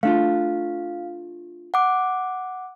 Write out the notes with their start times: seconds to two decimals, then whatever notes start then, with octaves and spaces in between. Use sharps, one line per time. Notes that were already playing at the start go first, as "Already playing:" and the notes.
0.03 A3 D4 F4 F5
1.74 F#5 D6